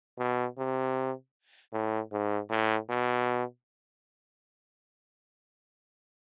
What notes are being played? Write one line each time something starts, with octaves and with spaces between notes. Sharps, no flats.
B2
C3
A2
G#2
A2
B2